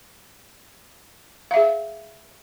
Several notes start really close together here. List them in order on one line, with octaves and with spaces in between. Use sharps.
F5 E5 G#4